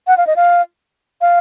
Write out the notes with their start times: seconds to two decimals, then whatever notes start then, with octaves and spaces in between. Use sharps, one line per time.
0.07 F#5
0.18 F5
0.27 D#5
0.36 F5
1.21 F5